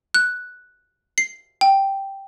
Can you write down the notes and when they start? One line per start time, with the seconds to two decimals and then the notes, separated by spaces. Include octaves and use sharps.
0.14 F#6
1.18 C7
1.61 G5